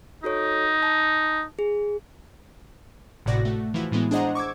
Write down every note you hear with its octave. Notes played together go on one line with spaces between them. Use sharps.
D#4 F#4 A4 C#5
A5
G#4
G#1 A2 C3 F#4 D5 A#6
A3 F#4
E3 F3 E4 F#4
A2 E3 G#3 B3
D4 G#4 C5 D#5 F#5 A#5
C#6 D6 E6 G#6